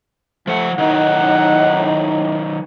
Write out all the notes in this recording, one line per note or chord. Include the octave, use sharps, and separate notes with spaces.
F3 A3 F#5
A2 D#3 F#3 D#4 F#5